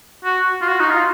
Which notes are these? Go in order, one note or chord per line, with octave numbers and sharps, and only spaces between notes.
F#4
F4
F#4
D#4
F4